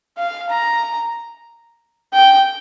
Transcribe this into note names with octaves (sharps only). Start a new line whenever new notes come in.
F5
A#5
G5